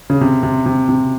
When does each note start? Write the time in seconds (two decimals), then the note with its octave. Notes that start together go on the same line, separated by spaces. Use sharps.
0.10 C#3
0.21 C3
0.43 C3
0.66 C3
0.89 C3